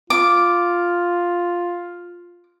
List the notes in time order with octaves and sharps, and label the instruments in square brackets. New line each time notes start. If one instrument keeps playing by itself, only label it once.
[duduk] F4 [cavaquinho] D6